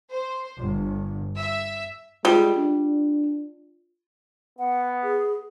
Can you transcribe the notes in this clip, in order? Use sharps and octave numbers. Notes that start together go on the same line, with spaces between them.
C5
G1
E5
G3 G#3 F4
D4
B3 F#5
G#4